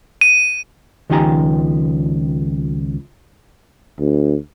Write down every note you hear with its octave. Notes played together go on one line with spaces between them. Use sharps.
D#7
C#2 D#3 F3 G4 G#5 A#5
D2